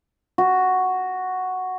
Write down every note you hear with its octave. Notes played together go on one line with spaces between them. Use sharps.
F#4